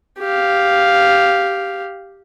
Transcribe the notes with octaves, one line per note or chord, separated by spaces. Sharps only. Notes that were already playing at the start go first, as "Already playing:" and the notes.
G4 F5